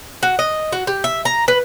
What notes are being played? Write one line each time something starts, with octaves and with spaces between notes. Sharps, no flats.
F#4
D#5
F#4
G4
E5
A#5
B4